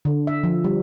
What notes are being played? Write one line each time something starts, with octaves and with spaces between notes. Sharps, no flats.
D3
E5
F3
G3